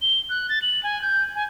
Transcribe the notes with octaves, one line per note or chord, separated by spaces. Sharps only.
G7
F#6
A6
F#7
G#5
G6
G#5